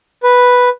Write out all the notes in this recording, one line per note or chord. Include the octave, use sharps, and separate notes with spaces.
B4